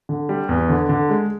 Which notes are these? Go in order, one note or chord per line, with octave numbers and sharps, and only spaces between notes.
D3
G3
E2
D3
D3
G#3